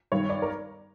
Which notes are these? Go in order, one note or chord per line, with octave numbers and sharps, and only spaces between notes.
G2 D#3 C#5
D5
A#4